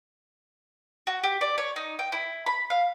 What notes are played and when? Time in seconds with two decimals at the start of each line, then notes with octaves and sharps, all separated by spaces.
1.07 F#4
1.23 G4
1.41 D5
1.58 C#5
1.76 D#4
1.99 G5
2.12 E4
2.46 B5
2.70 F5